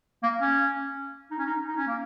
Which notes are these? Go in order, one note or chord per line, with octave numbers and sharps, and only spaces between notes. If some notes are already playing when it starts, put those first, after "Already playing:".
A#3
C#4
D#4
C#4
D#4
D#4
C#4
A#3